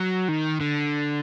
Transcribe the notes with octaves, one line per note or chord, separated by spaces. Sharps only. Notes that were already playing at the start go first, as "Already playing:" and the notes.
Already playing: F#3
D#3
D3